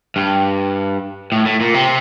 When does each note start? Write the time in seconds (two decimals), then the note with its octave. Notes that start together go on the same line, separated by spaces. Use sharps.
0.16 G2
1.32 A2
1.46 A2
1.61 A#2
1.74 C3